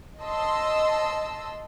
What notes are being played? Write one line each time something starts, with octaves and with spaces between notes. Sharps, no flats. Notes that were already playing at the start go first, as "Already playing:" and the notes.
D#5 A5 C6 E6